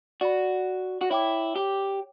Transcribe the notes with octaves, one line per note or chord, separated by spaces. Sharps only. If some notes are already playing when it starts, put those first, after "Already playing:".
F#4 D5 F#5 B5
F#4
E4 C#5 G5 D6
G4